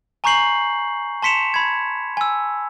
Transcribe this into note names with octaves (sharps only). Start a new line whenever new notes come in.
G#5 A#5 C#6 G6 C7 F#7
A5 C6 B6 C#7 E7 F7
B5 G#6
G#5 E6